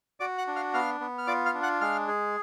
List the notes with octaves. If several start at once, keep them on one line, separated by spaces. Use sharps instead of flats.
F#4 D5 D6
F#5 F#6
D4
F5 F6
B3 F5 F6
B3
F6
F4 D5 D6
F5 F6
D4
F#5 F#6
G#3 F5 F6
G#4